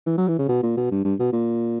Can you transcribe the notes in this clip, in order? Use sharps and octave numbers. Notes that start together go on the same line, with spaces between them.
E3
F#3
E3
C#3
B2
A#2
B2
G2
G2
B2
A#2